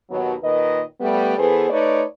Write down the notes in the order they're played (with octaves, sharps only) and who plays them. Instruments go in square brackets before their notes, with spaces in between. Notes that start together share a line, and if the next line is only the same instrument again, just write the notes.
[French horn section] D#2 B2 F#3
A#2 D#3 B4 D#5
G3 A3 B3
E3 B3 G#4 A4 B4 C5
A3 D#4 B4 C#5 D5